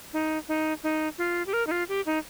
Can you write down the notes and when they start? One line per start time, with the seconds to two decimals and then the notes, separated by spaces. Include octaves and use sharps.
0.13 D#4
0.48 D#4
0.83 D#4
1.18 F4
1.46 G4
1.53 A#4
1.67 D#4
1.71 F4
1.89 G4
2.06 D#4